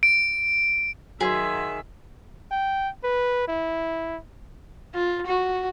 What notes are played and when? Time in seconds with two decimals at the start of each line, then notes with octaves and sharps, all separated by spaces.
0.03 D7
1.21 D#3 F#3 G#4 E5 C6 G#6 B6
2.51 G5
3.04 B4
3.48 E4
4.94 F4
5.26 F#4